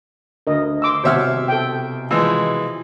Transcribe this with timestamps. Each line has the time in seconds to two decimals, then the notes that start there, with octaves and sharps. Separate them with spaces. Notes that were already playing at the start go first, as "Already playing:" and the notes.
0.47 D2 A#4 D#5
0.82 C6 D6 E6
1.04 C2 B2 C5 C#5 E5 F#5 F6
1.48 A4 G5
2.11 E3 F3 G#3